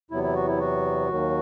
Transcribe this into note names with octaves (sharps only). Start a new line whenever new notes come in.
E2 C3 F#3 B3 E4
E4
F#4
E4
F#4
D#2 D#3 F#3